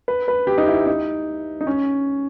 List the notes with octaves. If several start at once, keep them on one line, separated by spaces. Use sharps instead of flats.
B4
B4
G4
D#4
E4
D#4
D#4
C#4